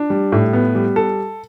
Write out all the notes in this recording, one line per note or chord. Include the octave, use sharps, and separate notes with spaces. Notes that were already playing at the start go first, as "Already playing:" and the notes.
Already playing: D4
G3
A2
B3
G3
A4